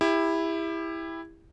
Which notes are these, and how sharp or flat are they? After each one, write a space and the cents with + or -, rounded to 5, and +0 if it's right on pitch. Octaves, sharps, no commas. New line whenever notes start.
E4 +0 G4 +30